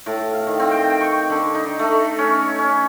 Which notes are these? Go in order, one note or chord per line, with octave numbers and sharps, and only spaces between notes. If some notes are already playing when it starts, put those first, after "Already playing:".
A2
F5
D#3
C4
G5
C#6
D3
D#4
A3
C#4
C#4